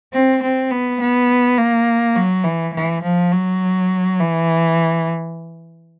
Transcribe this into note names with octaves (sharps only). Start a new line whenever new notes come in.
C4
C4
B3
B3
A#3
F#3
E3
E3
F3
F#3
E3